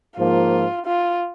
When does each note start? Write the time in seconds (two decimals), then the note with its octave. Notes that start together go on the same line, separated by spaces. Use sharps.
0.18 G#2 F3 A#3 F4
0.86 F4